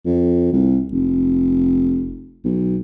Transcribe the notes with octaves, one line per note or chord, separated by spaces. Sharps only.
F2
C2
F1
B1